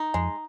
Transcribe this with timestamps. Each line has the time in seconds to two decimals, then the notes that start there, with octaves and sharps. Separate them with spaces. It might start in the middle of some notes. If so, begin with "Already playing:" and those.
Already playing: D#4
0.14 F2 G#3